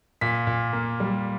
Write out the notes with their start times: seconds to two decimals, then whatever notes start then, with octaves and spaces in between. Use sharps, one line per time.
0.21 A#2 B6
0.47 A#2
0.73 A#3
1.00 G3